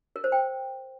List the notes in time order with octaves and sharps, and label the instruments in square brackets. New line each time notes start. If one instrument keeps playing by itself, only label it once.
[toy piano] A#4
C5
G5